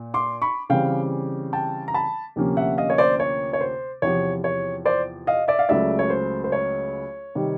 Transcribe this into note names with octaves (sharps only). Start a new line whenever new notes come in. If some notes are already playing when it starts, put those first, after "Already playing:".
Already playing: A#2
C6 D6
B5 C#6
C#3 E3 G3 C4 F5 G5
G5 A5
A#5
A5 B5
D2 C3 F3 A#3 C#4
E5 F#5
D#5 F5
C#5
C5 D5
C#5
C#5
C5
E2 C3 F3 C#5
C#5
C5 D5
D#5 F5
D5 E5
F5
C#2 C#3 F#3 A3 D5 E5
C#5
C5
C5
C#5
C3 D#3 G3 C4